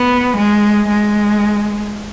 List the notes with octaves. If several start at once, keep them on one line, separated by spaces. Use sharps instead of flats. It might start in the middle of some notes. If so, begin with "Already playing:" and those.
Already playing: B3
G#3
G#3